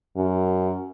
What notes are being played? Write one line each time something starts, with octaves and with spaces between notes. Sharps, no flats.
F#2